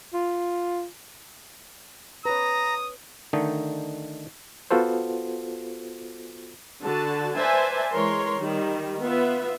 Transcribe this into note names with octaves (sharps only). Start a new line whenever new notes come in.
F4
B4 C#5 A#5 D#6
D3 D#3 A3 D#4
B3 F4 F#4 A4 C5
D3 F#4 A5
B4 C5 D5 E5 G#5 A5
E3 G#3 A#4 C#5 C6
D#3 G3
B3 F4 E5